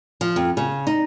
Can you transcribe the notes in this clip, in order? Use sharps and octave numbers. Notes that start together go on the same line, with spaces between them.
F3
F2
C#3
D#4